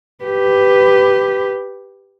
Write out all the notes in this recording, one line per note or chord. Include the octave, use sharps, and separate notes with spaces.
G4 B4